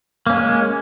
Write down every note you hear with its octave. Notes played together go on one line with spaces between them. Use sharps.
G#3 A#3 C#4